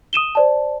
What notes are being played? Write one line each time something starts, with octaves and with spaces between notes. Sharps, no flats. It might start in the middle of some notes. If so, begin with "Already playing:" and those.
D#6 D#7 E7 G7
C5 D5 A5